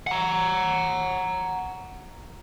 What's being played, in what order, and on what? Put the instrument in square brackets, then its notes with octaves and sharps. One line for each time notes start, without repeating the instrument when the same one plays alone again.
[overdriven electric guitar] F#5 A#5